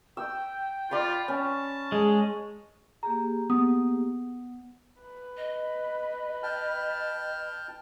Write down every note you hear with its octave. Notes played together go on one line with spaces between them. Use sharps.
G5 E6
F4 D5 B5 C6
C#4 A5
G#3 G#4
A#3 G4 G#4 A#5
B3 D#6
B4
D#5
G5 A5 F6